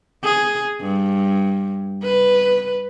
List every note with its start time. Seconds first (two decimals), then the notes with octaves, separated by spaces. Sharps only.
0.24 G#4
0.81 G2
2.04 B4